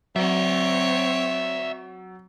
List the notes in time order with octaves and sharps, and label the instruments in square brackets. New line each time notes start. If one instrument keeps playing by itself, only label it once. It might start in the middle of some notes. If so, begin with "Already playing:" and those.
[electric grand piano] F#3 [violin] C4 C#5 [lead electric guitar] D5 E5